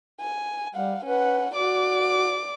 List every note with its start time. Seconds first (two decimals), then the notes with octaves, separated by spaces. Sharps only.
0.20 G#5
0.75 G3 F5 F#5
1.05 C#4 B4 F#5
1.54 F#4 D5 D6